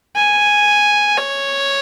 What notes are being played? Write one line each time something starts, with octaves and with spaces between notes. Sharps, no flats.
G#5
C#5